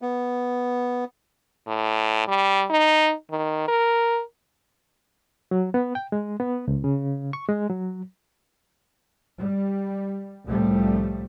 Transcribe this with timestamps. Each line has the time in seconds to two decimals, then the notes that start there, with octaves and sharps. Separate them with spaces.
0.02 B3
1.68 A2
2.28 G3
2.70 D#4
3.31 D#3
3.68 A#4
5.51 F#3
5.74 B3
5.95 G5
6.12 G#3
6.40 B3
6.68 C#2
6.84 C#3
7.33 C#6
7.48 G#3
7.69 F#3
9.41 G3
10.47 C2 A2 F3 G3 A3